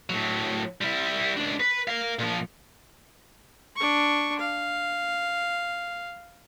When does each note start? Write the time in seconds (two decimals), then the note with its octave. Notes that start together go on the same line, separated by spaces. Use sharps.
0.10 A2 F#3
0.81 G3 E4
1.37 C#2 D4
1.60 B4
1.88 A#4 F5
2.19 A#2 F3
3.76 D4 C#6
4.39 F5